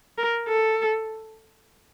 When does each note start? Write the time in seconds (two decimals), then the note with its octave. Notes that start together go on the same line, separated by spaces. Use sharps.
0.18 A#4
0.49 A4